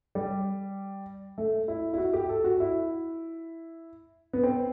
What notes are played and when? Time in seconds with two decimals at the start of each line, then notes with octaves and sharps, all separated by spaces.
0.15 G3
1.38 A3
1.68 E4
1.93 E4
1.98 F#4
2.13 G4
2.29 A4
2.44 F#4
2.60 E4
4.33 B3
4.43 C4